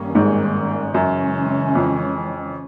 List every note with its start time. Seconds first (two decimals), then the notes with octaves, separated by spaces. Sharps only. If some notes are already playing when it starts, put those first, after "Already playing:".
Already playing: G2 D#3 G3 A#3 C#4
0.15 G#1 G#2
0.94 F#2 C#3 E3 G#3 C#4
1.75 F2